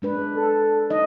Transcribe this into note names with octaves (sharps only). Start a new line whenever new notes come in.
G#3 D4 B4
A4
D#4 D#5